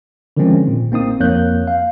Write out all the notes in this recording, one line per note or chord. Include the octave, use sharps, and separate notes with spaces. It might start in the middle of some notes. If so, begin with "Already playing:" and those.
D3 D#3 F3 G#3 C4 C#4
A#2
A1 A#3 C4 D#4 D#6
F2 A#3 C#5 F#6 G6
F5